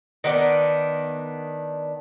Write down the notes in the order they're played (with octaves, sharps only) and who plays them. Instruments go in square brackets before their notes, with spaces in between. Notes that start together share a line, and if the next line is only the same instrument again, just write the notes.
[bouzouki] D#3 B3 D4